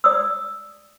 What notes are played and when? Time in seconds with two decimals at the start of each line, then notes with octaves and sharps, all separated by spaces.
0.04 D5 D#6 E6